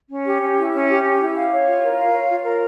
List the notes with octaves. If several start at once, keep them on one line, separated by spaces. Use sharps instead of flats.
C#4
G4
C#4
E4
C#4
G4
C#4
E4
F5
C#5
F4
A#4
F5
C#5
F4
A#4